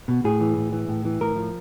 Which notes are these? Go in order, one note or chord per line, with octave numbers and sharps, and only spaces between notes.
B2
A2 G#4
E3
A2
E3
A2
E3
A2 A#4
F3